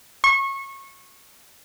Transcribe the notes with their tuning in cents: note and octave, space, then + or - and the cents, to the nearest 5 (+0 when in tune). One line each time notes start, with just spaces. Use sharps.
C#6 -30